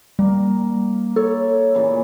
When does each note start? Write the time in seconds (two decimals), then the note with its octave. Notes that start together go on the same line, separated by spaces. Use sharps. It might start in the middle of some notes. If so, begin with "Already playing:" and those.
0.19 G3 A#3
1.16 A4 C#5
1.75 A#2 C#3 E3